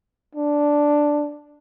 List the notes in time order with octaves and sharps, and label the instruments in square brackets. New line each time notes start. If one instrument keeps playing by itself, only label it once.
[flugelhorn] D4